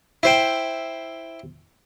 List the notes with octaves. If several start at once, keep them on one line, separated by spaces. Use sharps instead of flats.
E4 C5 G5